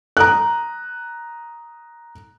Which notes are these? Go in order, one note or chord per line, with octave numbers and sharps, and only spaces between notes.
A#5 D#6 F#6